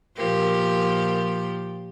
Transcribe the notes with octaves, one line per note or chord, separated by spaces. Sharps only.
A#2 F3 G4 A#4